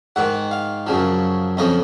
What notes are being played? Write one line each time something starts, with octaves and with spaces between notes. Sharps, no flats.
G#2 D#3 F#5
F5
F#2 C#3 F3
F2 C#3 F3 D#5